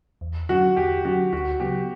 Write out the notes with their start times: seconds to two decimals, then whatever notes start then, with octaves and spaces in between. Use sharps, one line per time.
0.21 E2
0.49 D3 F#3 C#4 F#4
0.77 E2 G4
1.05 D3 F#3 C#4 F#4
1.33 D2 F#4
1.60 C#3 F#3 B3 G4